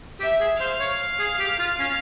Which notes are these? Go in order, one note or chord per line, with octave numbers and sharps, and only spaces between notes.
G4 E5
G#4
C5 F5
C#5
G#4
G4
F4
C#4